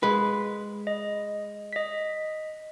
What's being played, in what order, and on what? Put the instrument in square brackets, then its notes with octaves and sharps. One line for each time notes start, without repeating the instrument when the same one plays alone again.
[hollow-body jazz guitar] G#3 B4
[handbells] D#5
D#5 B6